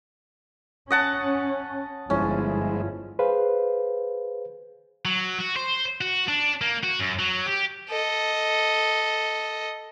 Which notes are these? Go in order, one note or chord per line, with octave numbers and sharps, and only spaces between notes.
C#4 D#5 F#5 A5
G1 F3 G#3 C#4 E4
G#4 B4 C5 F5
F#3
F#4
C5
F#4
D4
A#3
F#4
F#2
F#3
G4
A4 D#5